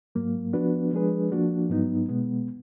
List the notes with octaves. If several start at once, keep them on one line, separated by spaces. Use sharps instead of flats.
G#2 F#3 A#3
F3 B3 D4 F#4 B4
F3 G#3 D4 G#4 B4
F3 A#3 D4 F#4
G#2 F#3 B3 D#4
B2 G#3 B3